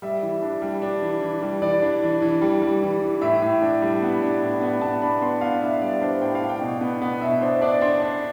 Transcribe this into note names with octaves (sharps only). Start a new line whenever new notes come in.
G3 E5
E3
D4
G3
D4
E3
E3
G3
E3 D5
D4
E3
E3
G3
G3
E3
E3
A2 E5
A2
D4
G3
B3
D4
A2
B3
B3 A5
D4 B5
B3 C6
B3 F5
D4 E5
G3 D5
D4 C5
A2 G5
F5
D4
G5
B2
B3
B3
B2 E5
D4 C5
D4 D5
D4 C6
D4